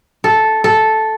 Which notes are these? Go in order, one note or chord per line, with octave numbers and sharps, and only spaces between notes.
A4
A4